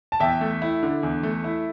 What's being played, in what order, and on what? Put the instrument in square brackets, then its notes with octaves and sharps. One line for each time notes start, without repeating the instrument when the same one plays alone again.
[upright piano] A5
[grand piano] E2 [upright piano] E5 G5
[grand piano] A3
E4
D3
E2
A3
E4